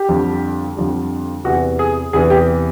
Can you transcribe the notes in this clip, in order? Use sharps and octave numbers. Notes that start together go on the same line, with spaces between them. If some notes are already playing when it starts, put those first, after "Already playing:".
Already playing: G4
F2 D3 G3
F2 D3 G3
E2 C3 E3 F#4
G#4
E2 C3 E3 G#4
G4